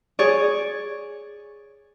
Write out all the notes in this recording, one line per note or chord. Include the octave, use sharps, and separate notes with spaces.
G#4 C#5 D5